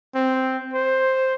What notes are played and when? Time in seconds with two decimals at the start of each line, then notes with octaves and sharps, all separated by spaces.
0.15 C4
0.73 C5